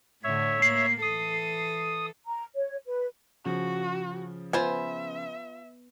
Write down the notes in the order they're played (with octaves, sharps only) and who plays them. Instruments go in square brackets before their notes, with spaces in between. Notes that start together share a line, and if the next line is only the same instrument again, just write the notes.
[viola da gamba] A2 D3 [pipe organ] C#5 E5
[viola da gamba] A#3 [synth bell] C7
[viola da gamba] E3 A4 [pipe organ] D#6
[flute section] A#5
C#5
B4
[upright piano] C#3 F3 [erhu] F#4
[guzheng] B3 [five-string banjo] F4 C5 G#5 [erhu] E5